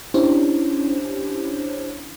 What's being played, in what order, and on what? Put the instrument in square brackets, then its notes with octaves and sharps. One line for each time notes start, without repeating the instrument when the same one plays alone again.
[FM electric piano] C#4 D4 E4 G4 C5 C#5